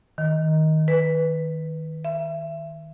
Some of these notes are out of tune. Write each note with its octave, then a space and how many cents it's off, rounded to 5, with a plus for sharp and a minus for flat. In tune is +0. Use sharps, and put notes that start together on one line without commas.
D#3 +10
B4 +0
E5 +25